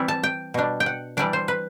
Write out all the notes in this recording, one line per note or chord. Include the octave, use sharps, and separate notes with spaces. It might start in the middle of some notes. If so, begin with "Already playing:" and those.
Already playing: E3 G3 C4 E4
A5
G5
B2 G3 D4
G5
F#5
E3 G3 D4 D5
C5
B4